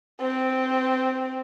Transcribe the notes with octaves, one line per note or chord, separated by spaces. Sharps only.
C4